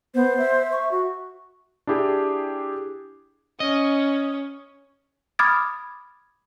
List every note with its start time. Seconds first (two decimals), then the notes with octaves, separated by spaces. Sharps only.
0.15 B3 C5
0.38 E5
0.72 C#6
0.91 F#4
1.87 D4 E4 G4 G#4
3.60 C#4 D#5
5.39 B5 D6 D#6 F6 G#6 A6